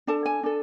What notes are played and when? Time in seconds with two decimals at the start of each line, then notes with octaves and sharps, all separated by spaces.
0.07 D4 A4 A5
0.26 G#5
0.43 D4 A4